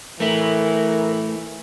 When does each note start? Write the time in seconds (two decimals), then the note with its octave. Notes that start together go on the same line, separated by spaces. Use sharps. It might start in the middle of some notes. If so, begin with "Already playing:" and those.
0.20 E3 A3 E4 A#4